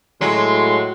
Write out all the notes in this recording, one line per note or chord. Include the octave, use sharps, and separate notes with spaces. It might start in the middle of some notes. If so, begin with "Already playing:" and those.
A2 F#3 G#3 C6